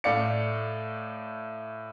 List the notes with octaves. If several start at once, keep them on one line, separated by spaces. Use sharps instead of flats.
A2 A3 D5 F5 C#7